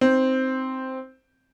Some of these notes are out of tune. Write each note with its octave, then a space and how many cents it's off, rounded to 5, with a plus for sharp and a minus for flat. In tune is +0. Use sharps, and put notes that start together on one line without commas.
C4 +0 D#4 +0